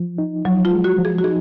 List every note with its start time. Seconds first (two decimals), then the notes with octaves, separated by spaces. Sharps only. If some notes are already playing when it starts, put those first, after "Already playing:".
Already playing: F3
0.18 D#4
0.45 F3 F#3
0.65 F4
0.71 G#3
0.84 F#4
0.98 F3
1.05 G#4
1.19 F#4
1.24 D#4 G#4